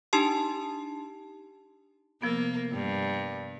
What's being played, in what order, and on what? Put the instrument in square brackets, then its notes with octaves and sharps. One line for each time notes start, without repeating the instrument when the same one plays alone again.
[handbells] D4 D#4 G4 A5 C6
[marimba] C3 F3 B3 [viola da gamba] A#3
[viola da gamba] G2